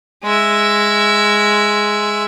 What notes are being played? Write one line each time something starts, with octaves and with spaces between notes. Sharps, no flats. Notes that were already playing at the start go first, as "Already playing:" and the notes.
G#3 E5